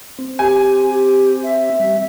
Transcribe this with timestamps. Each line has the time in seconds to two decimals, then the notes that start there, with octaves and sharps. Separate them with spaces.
0.19 C4
0.39 G4 G#5
0.91 G4
1.44 E5
1.80 G3